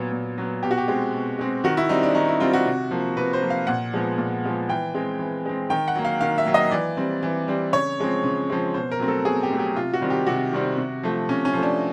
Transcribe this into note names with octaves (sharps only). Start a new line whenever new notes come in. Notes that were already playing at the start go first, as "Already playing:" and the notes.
Already playing: A#2 F#3 B3
A#2
F#3 B3
B2 G4
F#4
G4
G#3 C4
B2
G#3 C4
D#3 F#4
E4
G3 C4 D#4
D4
D#3 D#4
E4
G3 C4 F4
F#4
C3
F3 A#3
C3 B4
C5
F3 A#3
F5
A#2 F#5
F3 G#3 B3
A#2
F3 G#3 B3
E3 G5
G#3 C4
E3
G#3 C4
D#3 G5
F#5
F#3 A#3
F5
D#3 F5
E5
F#3 A#3
D#5
E3 D5
G3 C4
E3
G3 C4
C#3 C#5
F3 G#3 C4
C#3
F3 G#3 C4
B2 C5
A#4
F#3 A3 C4
A4
B2 G#4
G4
F#3 A3 C4
G4
C3 F4
F#4
D#3 G3 C4
G4
C3 F#4
D#3 G3 C4
C3
F3 A3
C3 C#4
C#4
F3 A3
D4